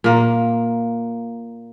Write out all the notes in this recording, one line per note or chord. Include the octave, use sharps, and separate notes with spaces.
A#2 A#3